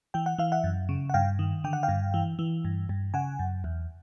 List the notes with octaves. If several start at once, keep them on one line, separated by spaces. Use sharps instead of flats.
E3 G5
F#5
E3 F5
E5 F#5
F#2
C#3
F#5
G2 F5 G5
D#3
D3 G5
F#5
F5 G5
G2
E3
E3
G2
G2
C#3 F#5 G#5
F#2
E2